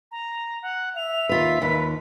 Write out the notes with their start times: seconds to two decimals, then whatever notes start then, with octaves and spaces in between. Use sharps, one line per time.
0.11 A#5
0.63 F#5
0.96 E5 F7
1.29 D#2 F4 B4 B6
1.62 D#2 B4